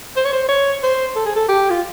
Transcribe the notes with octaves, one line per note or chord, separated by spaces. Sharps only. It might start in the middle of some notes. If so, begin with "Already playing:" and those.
C5
C#5
C5
C#5
C5
A4
G#4
A4
G4
F4